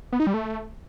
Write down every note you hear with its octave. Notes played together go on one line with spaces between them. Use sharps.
B3
D#4
G3
A3